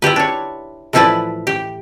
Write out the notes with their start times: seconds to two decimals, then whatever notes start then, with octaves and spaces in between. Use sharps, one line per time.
0.02 E4 F4 G4 B4
0.16 D4 C#5
0.93 A2 E3 F3 E4 B4 D5
1.47 G4